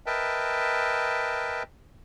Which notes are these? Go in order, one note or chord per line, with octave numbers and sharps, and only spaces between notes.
A#4 B4 D#5 E5 G5 A5